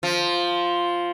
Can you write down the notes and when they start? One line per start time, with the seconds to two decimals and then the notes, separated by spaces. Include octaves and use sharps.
0.03 F3